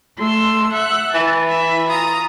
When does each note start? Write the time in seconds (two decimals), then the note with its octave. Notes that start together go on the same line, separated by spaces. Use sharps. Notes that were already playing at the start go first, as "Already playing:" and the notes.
0.18 A3 C6 E6
0.73 E5 F#5 F#6
1.14 E3 A5
1.47 E4 E5
1.89 F4 A#5 D#6